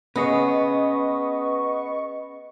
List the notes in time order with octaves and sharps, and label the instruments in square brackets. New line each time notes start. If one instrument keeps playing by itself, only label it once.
[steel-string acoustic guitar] B3 [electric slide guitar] C#4 G#4 [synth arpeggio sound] B4 D#5 C#6